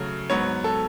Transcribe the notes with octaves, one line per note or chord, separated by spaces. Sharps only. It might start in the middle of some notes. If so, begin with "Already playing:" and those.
Already playing: C#3 F#3 A3
G#2 F#3 B3 C#5
A4